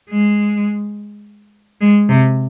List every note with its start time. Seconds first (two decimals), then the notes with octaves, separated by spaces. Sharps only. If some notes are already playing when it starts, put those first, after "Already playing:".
0.10 G#3
1.81 G#3
2.09 C3